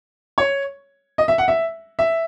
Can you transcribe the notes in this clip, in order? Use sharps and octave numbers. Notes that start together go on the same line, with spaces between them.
C#5
D#5
E5
F#5
E5
E5